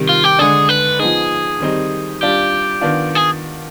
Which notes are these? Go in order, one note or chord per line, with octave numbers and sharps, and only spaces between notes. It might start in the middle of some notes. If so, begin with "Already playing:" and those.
Already playing: C3 D#3 G3
F4
G4
D3 G#3 D4 G#4
B4
F3 B3 D#4 G#4
D#3 G3 C4 D#4
G3 D4 F4 G4
D#3 B3 D4 F4
G#4